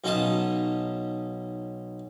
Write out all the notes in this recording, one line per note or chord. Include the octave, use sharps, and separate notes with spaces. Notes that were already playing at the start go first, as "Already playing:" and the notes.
B1 C#4 D#4 F5 A5 D#6